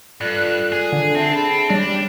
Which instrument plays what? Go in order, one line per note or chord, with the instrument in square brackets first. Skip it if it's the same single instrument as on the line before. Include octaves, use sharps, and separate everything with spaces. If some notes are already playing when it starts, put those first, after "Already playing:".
[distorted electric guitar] G2 [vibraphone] F4 A4 D5 [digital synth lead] F#6
[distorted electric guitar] G#4
[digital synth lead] D3
[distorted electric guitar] C4 [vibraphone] E5 G5 A5
[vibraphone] G#4 B5 [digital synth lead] A5
[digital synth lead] G3 [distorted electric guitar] D4 [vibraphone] C#5